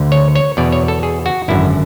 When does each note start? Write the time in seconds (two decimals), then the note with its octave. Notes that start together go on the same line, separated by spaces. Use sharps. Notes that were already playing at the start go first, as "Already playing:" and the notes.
Already playing: D2 D3
0.12 C#5
0.35 C#5
0.57 E2 B2 D5
0.72 C#5
0.88 A4
1.03 G#4
1.26 F#4
1.48 G#1 F#2 D3 E4